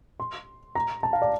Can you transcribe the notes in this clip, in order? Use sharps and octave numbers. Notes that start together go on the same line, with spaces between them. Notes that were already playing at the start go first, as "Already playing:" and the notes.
C6
A#5
A5
F5
D5